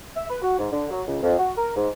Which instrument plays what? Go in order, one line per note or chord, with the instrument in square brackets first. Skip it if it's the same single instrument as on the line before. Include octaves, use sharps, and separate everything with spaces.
[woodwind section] E5
B4
F#4
G#2
D3
F#3
C#2
F2
F#4
A#4
G#2